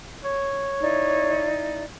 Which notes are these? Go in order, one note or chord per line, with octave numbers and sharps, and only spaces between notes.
C#5
D#4 E4 D5